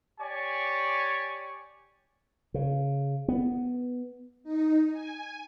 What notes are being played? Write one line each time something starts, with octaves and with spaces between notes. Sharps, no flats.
G4 C#5 D5 G#5 C#6
C#3
B3
D#4
G#5